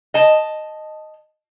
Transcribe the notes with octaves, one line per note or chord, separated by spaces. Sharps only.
D#5 A5